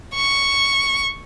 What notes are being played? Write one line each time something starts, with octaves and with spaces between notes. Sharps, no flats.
C#6